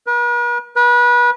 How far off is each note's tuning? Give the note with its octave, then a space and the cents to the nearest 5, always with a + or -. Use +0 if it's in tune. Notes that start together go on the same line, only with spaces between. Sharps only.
B4 -45
B4 -30